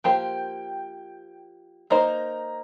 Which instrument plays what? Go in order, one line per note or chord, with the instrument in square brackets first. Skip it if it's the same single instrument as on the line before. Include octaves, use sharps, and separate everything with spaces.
[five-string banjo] F3 A#3 G4 C5 [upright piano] G5
[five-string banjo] A#3 D#4 C5 D#5 [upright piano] A#5